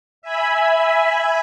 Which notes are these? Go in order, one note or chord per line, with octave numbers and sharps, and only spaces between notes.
E5 G#5 B5